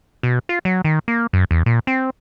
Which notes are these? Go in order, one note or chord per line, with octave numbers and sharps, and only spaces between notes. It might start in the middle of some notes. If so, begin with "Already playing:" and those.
B2
F4
F#3
D#3
A#3
F#2
E2
A#2
C4